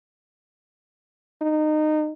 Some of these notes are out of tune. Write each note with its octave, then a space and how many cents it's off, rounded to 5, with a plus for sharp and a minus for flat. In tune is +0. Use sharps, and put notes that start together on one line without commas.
D#4 -20